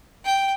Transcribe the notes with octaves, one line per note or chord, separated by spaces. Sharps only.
G5